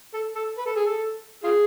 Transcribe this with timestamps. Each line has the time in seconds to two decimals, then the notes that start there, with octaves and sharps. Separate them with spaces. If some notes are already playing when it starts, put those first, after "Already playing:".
0.14 A4
0.35 A4
0.58 B4
0.66 A4
0.76 G#4
0.86 A4
1.44 F4 G#4